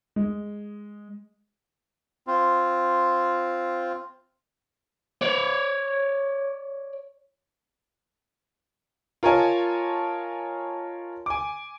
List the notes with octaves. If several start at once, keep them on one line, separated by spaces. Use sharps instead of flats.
G#3
C4 F4
C#5 D5
F4 A#4 C#5 D#5 G#5 A5
G#5 D6